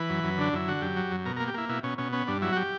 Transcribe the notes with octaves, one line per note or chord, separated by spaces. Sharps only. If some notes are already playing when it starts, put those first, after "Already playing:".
Already playing: E3 B4
F#2
F#2
D3 D4
F#2 E4
D3 F#4
F#2 G4
F#3
F#2
B2 A#4
A#4
A#3
G4
A#3 E4
B2 E4
B2 C#4
B2 C#4
B3 C#4
G2 D4
F#3 E4
F#4
G4